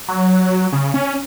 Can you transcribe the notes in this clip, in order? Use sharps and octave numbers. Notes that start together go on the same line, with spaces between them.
F#3
C#3
C#4